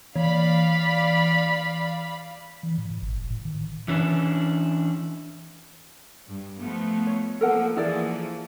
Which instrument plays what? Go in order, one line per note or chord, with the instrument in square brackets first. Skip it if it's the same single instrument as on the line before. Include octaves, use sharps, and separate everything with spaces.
[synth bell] E3 [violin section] D5 F5 B5
[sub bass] E3
A2
A2
G#1
F#1
A2
D#3
[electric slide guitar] E3 C#4 D4
[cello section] G2
F3 A3 B3
[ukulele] C#5
[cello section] F3 A#3 [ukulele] A4 A#4 F#5
[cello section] E3 F3 A#3 [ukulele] E4 G#4 D5